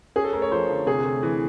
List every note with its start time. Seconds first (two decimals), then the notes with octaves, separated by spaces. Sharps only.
0.16 C#4 G#4
0.24 A4
0.33 A3 A#4
0.42 C#5
0.52 F3 C5
0.70 D3
0.86 C3 G#4
1.04 A3
1.23 E3